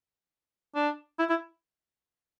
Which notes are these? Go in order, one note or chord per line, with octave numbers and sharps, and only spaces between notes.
D4
E4
E4